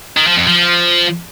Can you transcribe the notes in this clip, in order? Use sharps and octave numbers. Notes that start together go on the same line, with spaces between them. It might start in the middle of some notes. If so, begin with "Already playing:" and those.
D#3
F3
F2
F3